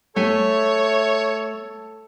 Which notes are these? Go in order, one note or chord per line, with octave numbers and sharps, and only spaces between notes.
A3 A4 C#5 E5 G#5